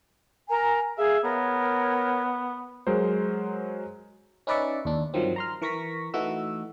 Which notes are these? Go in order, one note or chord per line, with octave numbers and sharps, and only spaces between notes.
A#4 G#5 A#5
G#4 E5 F5
B3 A#4 C#5
F#3 G#3 A#4 C5
C#4 D#4 B4 D5 E5 C#6
D#2 D4
G2 D#3 F3 F#3 C4
A#5 C6 F6
E3 A#4 C#6 A#6 B6
E3 A3 D#4 F#4 E6